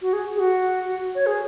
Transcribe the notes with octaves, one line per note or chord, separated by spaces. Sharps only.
F#4
G#4
G#4
F#4
C#5
G#4